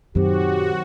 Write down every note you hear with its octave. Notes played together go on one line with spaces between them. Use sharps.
F#2 A#2 D#3 F#3 C4 F#4 G4